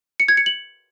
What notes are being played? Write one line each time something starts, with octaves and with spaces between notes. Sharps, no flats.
C#7
G#6
C#7
F#7